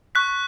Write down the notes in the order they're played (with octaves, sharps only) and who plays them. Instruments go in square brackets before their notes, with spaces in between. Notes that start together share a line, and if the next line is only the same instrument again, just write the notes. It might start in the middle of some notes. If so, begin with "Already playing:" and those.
[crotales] C#6 F#6 B6